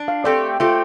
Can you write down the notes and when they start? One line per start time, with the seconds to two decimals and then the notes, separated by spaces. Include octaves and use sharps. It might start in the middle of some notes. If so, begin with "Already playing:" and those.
Already playing: D4
0.08 F5
0.24 A3 C4 G4 D5
0.60 A3 C4 F4 G4